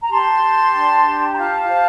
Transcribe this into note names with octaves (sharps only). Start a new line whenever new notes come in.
A#5
G4 A5 C6
G4
D4
G4
A#5
F4 F5 A5
C5